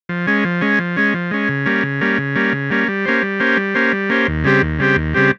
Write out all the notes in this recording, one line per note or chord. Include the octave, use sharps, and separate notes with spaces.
F3
G#3 C#4
F3
G#3 C#4
F3
G#3 C#4
F3
G#3 C#4
C#3
G3 A#3 C#4
C#3
G3 A#3 C#4
C#3
G3 A#3 C#4
C#3
G3 A#3 C#4
G3
A#3 C#4 G4 C5
G3
A#3 C#4 G4 C5
G3
A#3 C#4 G4 C5
G3
A#3 C#4 G4 C5
D#2
C#3 G3 C4 G4
D#2
C#3 G3 C4 G4
D#2
C#3 G3 C4 G4